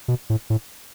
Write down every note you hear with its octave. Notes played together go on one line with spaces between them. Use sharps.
B2
A2
A2